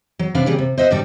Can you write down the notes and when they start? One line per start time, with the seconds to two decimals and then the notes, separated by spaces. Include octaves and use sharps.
0.19 F#3
0.35 C3 D4 B4 F5
0.46 C#3 G3 A#3
0.58 C3
0.78 C5 D#5 E5 F#5
0.91 G2 D3 G3 A4